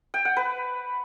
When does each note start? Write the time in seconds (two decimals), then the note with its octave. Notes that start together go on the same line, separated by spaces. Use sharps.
0.14 G5
0.25 F#5
0.37 B4